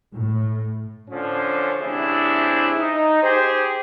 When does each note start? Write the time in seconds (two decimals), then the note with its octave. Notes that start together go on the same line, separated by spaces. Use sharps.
0.13 A2
1.09 D3 F3 C#4
1.81 A1 C3 D4 E4 G#4
2.79 D#4
3.24 G4 G#4 C5